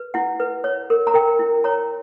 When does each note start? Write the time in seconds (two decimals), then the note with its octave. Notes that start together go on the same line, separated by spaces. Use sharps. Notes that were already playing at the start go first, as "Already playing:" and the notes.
Already playing: B4
0.14 E4 F#5
0.40 B4
0.64 C#5
0.90 A#4
1.07 A#5
1.14 A#4 G5
1.39 E4
1.64 C#5 A#5